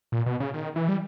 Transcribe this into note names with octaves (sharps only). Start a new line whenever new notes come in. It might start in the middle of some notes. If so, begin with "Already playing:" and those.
A#2
B2
C#3
D#3
E3
G3